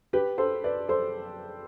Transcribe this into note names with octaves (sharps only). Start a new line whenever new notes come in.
G4 B4
A4 C5
B4 D5
A4 C5